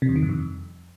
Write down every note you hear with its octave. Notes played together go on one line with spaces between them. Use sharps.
C3
E2
D#3
G2
F2